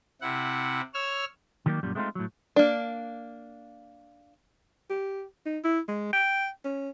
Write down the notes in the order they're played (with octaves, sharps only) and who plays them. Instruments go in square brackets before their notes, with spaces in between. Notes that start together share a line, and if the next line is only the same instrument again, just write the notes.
[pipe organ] C3 E4 F#5
C#5 E6 F6
[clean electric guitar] D#3 F#3 G3 A#3 G4
F#2 A#2 G3
G#3 A3 C4 D4 D#4 F4
A2 F#3
[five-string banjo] A#3 D4
[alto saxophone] G4
D#4
E4
G#3
G5
C#4